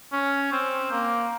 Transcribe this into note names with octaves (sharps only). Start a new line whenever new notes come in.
C#4
C4
A#3